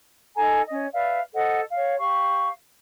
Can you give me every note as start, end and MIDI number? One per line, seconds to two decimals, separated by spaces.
0.36 0.60 63
0.36 0.60 69
0.36 0.60 80
0.36 0.60 82
0.67 0.85 61
0.67 0.85 75
0.93 1.18 71
0.93 1.18 74
0.93 1.18 76
0.93 1.18 77
1.33 1.61 69
1.33 1.61 72
1.33 1.61 75
1.33 1.61 78
1.70 1.97 73
1.70 1.97 77
1.98 2.48 67
1.98 2.48 77
1.98 2.48 85